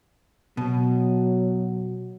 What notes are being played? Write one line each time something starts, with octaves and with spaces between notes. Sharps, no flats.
B2 F#3